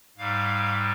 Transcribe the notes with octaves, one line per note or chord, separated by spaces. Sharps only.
G#2 G3 F5